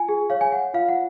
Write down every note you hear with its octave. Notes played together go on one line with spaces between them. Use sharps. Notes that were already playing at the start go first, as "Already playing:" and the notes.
Already playing: F4 G#5
G#4
C#5 F5
G#5
C#5 F#5
F4 F5
F#5